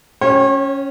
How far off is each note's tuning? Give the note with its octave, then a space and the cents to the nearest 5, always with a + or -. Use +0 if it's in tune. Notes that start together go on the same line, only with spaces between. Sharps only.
C#4 +0 C#5 -35 G5 -5